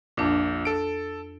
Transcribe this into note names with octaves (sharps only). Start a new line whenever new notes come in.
A#1 F2 A#2 D4 D6
A4 D7